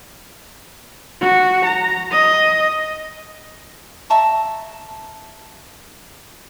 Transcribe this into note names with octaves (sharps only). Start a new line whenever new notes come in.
F#4
A#5
D#5
E5 A5 A#5 C#6